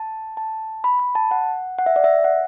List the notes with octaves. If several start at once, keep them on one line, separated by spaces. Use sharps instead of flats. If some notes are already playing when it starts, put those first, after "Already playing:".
Already playing: A5
A5
B5
B5
A5
F#5
F#5
E5
D5
E5
F#5